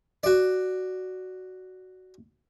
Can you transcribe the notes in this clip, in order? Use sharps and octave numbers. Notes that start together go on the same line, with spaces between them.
F#4 D5